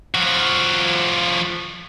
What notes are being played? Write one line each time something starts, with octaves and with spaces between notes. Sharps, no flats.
F3 F#4